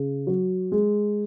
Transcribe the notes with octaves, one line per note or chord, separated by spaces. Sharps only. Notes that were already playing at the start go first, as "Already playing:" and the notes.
Already playing: C#3
F#3
G#3